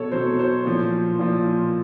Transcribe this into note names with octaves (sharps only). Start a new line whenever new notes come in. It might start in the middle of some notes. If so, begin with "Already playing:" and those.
Already playing: B2 F#3 A4 C#5
B2 F#3 C5
C5
A#2 F3
A#2 F3